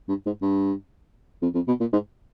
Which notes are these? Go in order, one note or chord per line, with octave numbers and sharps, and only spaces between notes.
G2
G#2
G2
F2
F2
B2
A#2
G#2